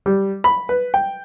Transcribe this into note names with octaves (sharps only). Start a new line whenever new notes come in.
G3
B5
B4
G5